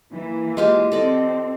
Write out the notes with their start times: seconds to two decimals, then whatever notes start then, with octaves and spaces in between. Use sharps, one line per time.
0.13 E3 A#3
0.57 G#3 F4 G4
0.92 C4 A4 D5 D#5